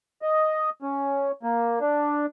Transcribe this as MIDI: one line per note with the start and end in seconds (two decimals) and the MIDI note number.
0.22 0.70 75
0.82 1.32 61
1.43 1.79 58
1.81 2.26 62